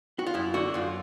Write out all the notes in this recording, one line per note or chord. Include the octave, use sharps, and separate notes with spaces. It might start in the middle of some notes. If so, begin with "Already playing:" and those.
F#4
F4
F#2 E4
D3 F#4
F#2 F4